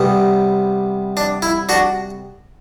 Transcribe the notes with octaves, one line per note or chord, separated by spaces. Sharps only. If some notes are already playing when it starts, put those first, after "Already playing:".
Already playing: C3 G3 B3
D4
E4
D4 F#4